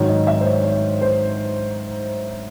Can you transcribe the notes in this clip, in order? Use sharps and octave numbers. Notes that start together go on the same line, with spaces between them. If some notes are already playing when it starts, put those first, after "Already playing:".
Already playing: G#2 D#3 F#3 C#5
D#5
E5
C5
C#5
C#5
C5